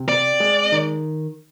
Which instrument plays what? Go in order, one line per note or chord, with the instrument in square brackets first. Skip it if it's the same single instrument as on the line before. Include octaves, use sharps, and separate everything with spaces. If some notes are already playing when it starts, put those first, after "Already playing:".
Already playing: [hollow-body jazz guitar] C3
[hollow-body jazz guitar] C4 [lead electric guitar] D5
[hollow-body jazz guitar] G#3
D#3